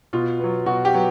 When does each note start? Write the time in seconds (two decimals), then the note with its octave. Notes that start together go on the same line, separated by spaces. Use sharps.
0.13 B2 F4
0.40 F#3 B3
0.66 B2 F#4
0.85 G4
0.93 F#3 B3